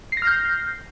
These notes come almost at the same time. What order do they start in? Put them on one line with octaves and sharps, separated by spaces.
C7 A#6 F6 G6